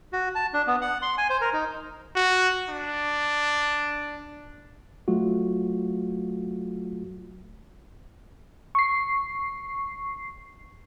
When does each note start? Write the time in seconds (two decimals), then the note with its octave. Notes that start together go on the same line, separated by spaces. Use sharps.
0.13 F#4
0.35 A5
0.54 D4
0.67 B3
0.81 F#5
1.02 C6
1.18 G#5
1.30 C5
1.41 A#4
1.53 D#4
2.16 F#4
2.69 D4
5.08 F#3 A3 F4 F#4
8.75 C#6 C7